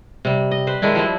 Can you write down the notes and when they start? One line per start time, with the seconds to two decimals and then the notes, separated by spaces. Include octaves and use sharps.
0.25 C3 G3
0.51 D#5
0.67 B4 C5
0.82 D#3 G#3 D4 E4
0.95 F3 G3 C4 E4